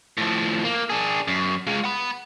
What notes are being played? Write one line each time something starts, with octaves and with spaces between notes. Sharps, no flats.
A2 F3
A#3
D4 G#4
F#2
G#3 F4
F#5 B5